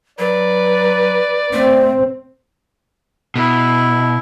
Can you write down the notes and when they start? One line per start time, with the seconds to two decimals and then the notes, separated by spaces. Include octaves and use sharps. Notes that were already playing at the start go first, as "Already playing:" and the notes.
0.19 F#3 B4 D5
1.53 A3 C4
3.35 B2 E4